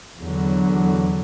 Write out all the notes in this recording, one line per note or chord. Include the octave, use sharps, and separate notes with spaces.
E2 D3 F#3